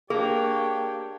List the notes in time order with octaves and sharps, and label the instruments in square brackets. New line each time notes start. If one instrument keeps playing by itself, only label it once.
[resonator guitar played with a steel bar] A#3 [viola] D4 C#5 [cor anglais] G4 [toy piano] G#4